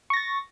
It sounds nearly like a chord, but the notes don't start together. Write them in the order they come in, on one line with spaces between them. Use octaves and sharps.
C#6 A#6 A6